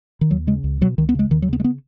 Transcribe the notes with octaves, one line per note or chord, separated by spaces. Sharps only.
D#3
D#2 F#3
C#3 G#3
C#2
B2 F#3
C#2 D#3
B3
C#3 G#3
D#2 D#3
F#3
C#3 B3
G#3
B3